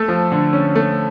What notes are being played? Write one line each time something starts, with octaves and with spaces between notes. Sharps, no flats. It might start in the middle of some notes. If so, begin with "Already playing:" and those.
Already playing: A3 A4
F3
D3
C#4
A3